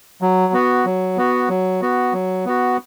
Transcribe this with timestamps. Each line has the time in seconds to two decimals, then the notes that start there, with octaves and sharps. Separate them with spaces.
0.21 F#3
0.53 B3 F#4
0.85 F#3
1.17 B3 F#4
1.49 F#3
1.82 B3 F#4
2.13 F#3
2.46 B3 F#4